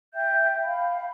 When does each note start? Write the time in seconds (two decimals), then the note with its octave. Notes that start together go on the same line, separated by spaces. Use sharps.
0.14 E5 G5 G6
0.63 F5 B5